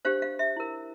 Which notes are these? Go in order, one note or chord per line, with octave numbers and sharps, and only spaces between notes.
D4 G4 C5 F5
F5
E5
E4 A#4